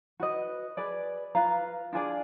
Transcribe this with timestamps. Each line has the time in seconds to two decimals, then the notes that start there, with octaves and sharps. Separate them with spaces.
0.20 F#4 B4 D#5
0.77 G#4 B4 D5
1.35 F4 B4 F5 A#5
1.92 D4 F4 G#4 D5